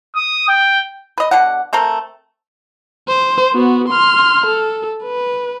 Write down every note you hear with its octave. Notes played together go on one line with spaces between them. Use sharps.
D#6
G5
B4 D#5
B2 D3 F#5
A3 C4 A4 A#4
C5
B3 F#4
C6 F6
A4
B4